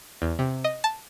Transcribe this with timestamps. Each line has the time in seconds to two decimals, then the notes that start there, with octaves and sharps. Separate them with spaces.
0.22 E2
0.39 C3
0.64 D#5
0.84 A5